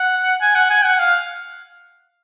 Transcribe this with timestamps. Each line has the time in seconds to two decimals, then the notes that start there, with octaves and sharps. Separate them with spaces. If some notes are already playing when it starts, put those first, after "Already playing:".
Already playing: F#5
0.41 G#5
0.55 F#5
0.70 G#5
0.85 F#5
0.99 F5